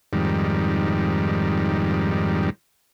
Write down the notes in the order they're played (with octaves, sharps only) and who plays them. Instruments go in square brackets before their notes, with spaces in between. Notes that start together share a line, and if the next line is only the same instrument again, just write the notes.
[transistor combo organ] F2 G#2 D#3 G3